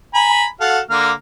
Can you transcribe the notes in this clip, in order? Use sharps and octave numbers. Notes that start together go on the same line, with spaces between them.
G#5 A#5 B5
F#4 A4 F5
D3 A#3 F6